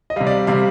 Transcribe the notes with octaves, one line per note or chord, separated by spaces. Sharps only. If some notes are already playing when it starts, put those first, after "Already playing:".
D#5
C3 G3 F5
D5
C3 G3 F5